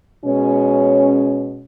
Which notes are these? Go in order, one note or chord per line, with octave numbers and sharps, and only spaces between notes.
B2 G#3 C#4